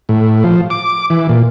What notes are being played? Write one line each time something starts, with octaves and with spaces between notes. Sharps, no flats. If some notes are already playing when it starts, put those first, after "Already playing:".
A2
F3
D6
E3
A#2